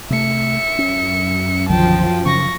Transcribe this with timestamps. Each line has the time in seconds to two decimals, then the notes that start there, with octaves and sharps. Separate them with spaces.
0.10 C3 A3 E5 C#7
0.78 F#2 C#4
1.69 B1 D3 D#3 F3 G5 A5
2.26 C#3 C#6 A#6